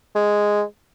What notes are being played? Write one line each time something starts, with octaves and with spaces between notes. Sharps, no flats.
G#3